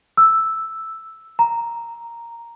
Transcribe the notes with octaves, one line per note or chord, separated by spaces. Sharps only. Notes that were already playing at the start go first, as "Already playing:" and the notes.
E6
A#5